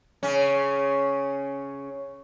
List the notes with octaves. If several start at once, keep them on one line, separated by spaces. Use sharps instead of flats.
C#3 C#4